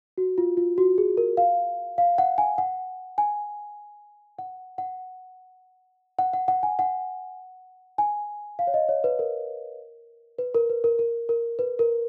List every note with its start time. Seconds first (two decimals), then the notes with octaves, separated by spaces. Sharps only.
0.18 F#4
0.38 F4
0.57 F4
0.78 F#4
0.98 G#4
1.17 A#4
1.37 F5
1.98 F5
2.18 F#5
2.38 G#5
2.58 F#5
3.18 G#5
4.39 F#5
4.78 F#5
6.19 F#5
6.33 F#5
6.48 F#5
6.63 G#5
6.79 F#5
7.98 G#5
8.59 F5
8.67 C#5
8.74 D#5
8.89 C#5
9.04 B4
9.19 A#4
10.38 B4
10.55 A#4
10.69 B4
10.84 A#4
10.99 A#4
11.29 A#4
11.59 B4
11.79 A#4